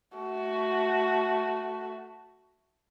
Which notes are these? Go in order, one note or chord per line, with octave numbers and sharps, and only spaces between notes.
A3 F#4